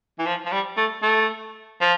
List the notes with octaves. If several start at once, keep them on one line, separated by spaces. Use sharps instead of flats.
E3
F3
F3
G3
A3
A3
F3